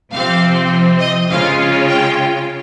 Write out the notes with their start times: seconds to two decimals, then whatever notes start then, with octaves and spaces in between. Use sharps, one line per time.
0.12 C3 F3 C4 F5
1.00 D#5
1.29 C#3 G#3 C#4 F4 F5
1.88 G5